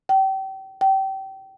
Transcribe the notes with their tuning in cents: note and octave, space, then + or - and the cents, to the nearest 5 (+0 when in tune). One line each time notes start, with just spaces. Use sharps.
G5 -30
G5 -25